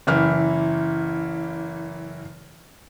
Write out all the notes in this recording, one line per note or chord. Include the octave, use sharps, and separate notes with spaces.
F#1 E3 E4 F6